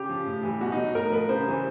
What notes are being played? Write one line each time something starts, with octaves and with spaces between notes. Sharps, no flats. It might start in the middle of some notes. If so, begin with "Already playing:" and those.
Already playing: C#3 G4
F3
A2
E3 G3
B2 F#4
D#4
F#3
A2 A#4
F3 B4
C#3 C5
E3 G3